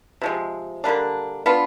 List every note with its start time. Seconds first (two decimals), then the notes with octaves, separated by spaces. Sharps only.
0.21 C3 F3 G#3
0.84 D3 G3 A#3 D4
1.46 B3 D4 F4